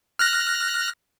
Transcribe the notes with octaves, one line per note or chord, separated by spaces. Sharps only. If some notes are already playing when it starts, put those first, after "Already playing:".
F6 F#6 A#6